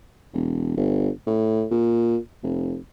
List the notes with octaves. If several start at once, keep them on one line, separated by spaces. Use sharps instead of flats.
E1
G1
A2
A#2
F1